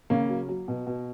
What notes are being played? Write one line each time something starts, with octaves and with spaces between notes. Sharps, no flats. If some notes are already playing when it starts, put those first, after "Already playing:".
C#3 A#3 C#4
F#3
F#3
B2
B2